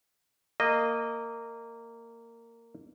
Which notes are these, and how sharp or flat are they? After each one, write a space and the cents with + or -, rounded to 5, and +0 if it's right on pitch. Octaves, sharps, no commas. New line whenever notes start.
A#3 -15 D#5 -10